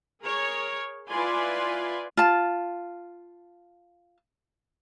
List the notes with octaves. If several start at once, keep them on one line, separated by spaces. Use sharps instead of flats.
G#4 A#4 C#5
E4 F4 B4 D5 G#5 C6
F4 A5